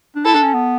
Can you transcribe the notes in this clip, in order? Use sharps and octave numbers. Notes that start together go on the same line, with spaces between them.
D4
E4 A4
D4
C#4
B3